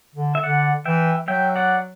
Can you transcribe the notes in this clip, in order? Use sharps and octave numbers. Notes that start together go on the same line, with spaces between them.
D3
E5
D3 D5 F#5
E3 E5 G5
F#3 E5 G5
D5 F#5